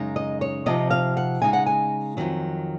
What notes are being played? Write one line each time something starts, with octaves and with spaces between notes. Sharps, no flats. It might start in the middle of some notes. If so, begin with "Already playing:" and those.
Already playing: F#2 C#3 G#3 D#4
D#5
C#5
C3 F3 C4 D#4 D#5
F5
F#5
C#3 G#3 D#4 G#5
F#5
G#5
F2 C3 D#3 F#3